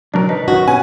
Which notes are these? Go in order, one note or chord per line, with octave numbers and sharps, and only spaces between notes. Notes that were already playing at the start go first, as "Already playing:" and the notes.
B1 F#3 D4 A#4
D#4 B4
D#3 C#4 F#4
B2 C#4 G#5